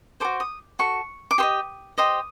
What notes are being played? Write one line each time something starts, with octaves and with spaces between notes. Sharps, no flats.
F#4 A4 C5 D6
D#6
F#4 A4 C#6
D6
G4 C5 D#5 D#6
G4 C5 D#5 D#6